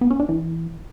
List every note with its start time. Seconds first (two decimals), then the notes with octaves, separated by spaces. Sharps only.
0.01 B3
0.10 C#4
0.20 D4
0.29 E3